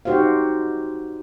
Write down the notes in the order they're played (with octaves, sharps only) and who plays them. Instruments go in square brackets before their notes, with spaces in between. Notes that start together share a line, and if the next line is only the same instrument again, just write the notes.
[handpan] D#4 F#4 G4 C5 F5